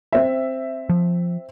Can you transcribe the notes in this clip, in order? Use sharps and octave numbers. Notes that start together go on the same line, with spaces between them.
C4 E5
F3